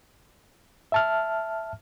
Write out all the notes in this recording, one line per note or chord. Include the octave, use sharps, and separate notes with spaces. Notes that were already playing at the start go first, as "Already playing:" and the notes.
E5 A5 F6